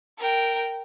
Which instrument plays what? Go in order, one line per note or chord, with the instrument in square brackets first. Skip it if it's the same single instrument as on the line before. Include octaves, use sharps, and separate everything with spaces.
[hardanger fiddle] A#4 G5